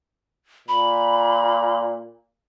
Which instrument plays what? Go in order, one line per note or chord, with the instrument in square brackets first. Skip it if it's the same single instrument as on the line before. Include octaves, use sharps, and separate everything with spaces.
[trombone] A#2 [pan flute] B5